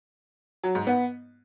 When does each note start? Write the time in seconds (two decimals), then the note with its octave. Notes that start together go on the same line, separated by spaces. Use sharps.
0.64 F#3
0.75 G#2
0.87 B3